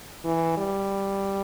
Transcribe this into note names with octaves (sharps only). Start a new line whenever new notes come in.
E3
G3